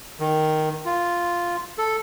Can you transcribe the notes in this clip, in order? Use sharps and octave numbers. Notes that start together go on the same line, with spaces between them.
D#3
F4
A4